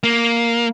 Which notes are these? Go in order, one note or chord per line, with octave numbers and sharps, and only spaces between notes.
A#3